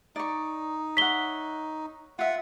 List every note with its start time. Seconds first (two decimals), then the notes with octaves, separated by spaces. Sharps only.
0.16 D#4 D5 C#6
0.97 C#5 E5 F#5 B6 G7
2.19 F4 E5 F#5